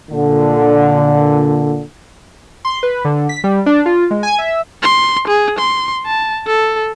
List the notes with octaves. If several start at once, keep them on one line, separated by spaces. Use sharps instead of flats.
A#2 D3
C6
B4
D3
B6
G3
D4
F4
G#3
G#5
E5
C6
G#4
C6
A5
A4